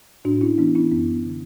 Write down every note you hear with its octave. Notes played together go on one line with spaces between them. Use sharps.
A2 D4 F#4
C#4 E4
E3 B3 D4
C#4 E4
F#2 B3
D3